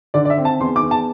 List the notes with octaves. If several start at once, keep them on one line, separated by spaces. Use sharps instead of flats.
D3 D5
D5
E5
C4
A5
E2 C6
D6
E2
A5